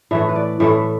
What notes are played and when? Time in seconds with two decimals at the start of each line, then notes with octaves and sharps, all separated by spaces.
0.11 A2 E3 A3 E5
0.29 B4
0.36 D5
0.60 A2 E3 A3 E5